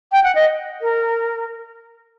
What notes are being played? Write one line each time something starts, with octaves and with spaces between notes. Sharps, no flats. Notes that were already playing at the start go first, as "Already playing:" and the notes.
G5
F#5
D#5
A#4